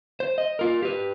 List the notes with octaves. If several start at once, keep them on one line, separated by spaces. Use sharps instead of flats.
C5
D#5
F4 A#4
G4 B4